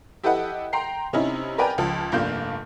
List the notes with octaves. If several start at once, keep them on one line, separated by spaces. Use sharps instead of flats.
E4 G4 A4 B4 D#5 F#5
G5 A#5 C6 C7
C3 C#4 D#4 E4
A#4 B4 D5 G5 G#5 A#5
C#2 F3 A5
F1 G2 A#3 D4 F4 G6